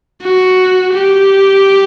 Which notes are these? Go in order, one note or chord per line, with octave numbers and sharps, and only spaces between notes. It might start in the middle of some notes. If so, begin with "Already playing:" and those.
F#4
G4